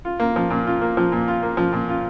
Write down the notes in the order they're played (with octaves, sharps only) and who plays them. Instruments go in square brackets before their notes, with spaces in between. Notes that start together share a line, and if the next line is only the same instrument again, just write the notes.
[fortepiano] F4
A#3
F3
A#2
F4
A#3
F3
A#2
F4
A#3
F3
A#2
F4